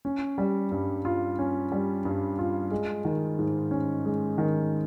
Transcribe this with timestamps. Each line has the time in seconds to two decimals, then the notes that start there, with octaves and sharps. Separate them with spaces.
0.05 C#4
0.38 G3
0.71 G2
1.05 F4
1.39 C#4
1.72 G3
2.05 G2
2.39 F4
2.71 G#3
3.05 D#3
3.39 G#2
3.71 C#4
4.05 G#3
4.38 D#3